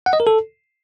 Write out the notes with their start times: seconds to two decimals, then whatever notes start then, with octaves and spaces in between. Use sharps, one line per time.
0.06 F#5
0.13 D#5
0.20 A#4
0.27 A4